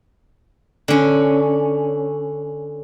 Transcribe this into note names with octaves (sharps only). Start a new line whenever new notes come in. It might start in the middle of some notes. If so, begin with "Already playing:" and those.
D3 C#4